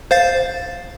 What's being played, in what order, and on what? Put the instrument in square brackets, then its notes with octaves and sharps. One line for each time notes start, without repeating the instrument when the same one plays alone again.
[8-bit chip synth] C5 F5 A6